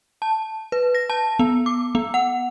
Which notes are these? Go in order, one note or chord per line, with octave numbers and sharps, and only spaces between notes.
A5
B4
A#6
A5
B3
D6
B3
F#5